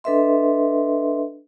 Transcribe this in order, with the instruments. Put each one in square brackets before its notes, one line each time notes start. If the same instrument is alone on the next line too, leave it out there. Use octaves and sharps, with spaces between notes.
[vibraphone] D4 A4 B4 D#5 E5 C6